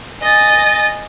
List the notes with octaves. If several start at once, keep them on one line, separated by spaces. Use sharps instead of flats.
D#5 G#5 A6